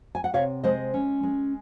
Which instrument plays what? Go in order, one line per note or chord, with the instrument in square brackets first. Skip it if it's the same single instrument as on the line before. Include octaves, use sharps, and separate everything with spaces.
[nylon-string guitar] G#5
F#5
C3 C#5 F5
G#3 C5 D#5
C#4
G#3